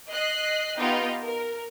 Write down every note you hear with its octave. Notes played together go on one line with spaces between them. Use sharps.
D#5 F#6 C7
B3 D#4 F4 G4 D#5 G5
A#4